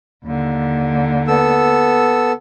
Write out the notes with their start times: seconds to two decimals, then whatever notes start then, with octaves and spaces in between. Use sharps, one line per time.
0.25 D#2 D3
1.28 B3 A4 E6